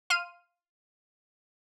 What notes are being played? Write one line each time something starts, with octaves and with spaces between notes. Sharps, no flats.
F5 C6 F6 D#7